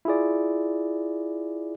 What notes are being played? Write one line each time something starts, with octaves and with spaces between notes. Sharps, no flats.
E4 F4 G#4 D5